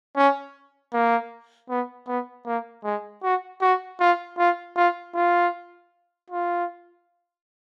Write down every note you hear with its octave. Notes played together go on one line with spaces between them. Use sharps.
C#4
A#3
B3
B3
A#3
G#3
F#4
F#4
F4
F4
F4
F4
F4